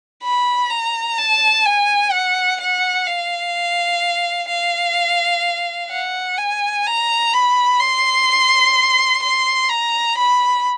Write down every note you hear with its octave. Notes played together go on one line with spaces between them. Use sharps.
B5
A#5
A5
G#5
F#5
F#5
F5
F5
F#5
G#5
A#5
B5
C6
C6
A#5
B5